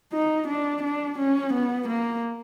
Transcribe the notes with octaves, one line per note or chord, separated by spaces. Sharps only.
D#4
D4
D4
C#4
B3
A#3